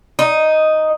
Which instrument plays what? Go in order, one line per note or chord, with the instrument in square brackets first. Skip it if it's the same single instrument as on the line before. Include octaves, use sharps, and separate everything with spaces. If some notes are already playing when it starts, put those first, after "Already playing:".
[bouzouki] D#4